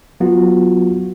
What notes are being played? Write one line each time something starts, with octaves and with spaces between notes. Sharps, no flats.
F#3 B3 F4 F#4